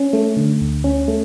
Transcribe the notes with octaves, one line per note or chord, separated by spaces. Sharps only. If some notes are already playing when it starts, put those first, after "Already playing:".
Already playing: C#4
A3
D3
D2
C#4
A3